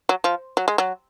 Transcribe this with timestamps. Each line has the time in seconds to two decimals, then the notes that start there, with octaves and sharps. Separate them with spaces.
0.09 F#3
0.24 F3
0.57 F#3
0.68 G#3
0.78 F#3